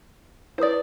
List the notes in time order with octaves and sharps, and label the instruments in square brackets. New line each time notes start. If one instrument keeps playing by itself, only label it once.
[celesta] E4 B4 D#6 [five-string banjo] C5 D5